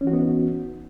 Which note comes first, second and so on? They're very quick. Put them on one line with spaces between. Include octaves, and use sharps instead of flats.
C#4 E3 F#4 D#4 B3